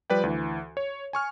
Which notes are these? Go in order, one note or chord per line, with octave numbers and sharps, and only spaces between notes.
F3 G3 B4 D5 G5
D2 E3
C#5
G#5 C#6 F6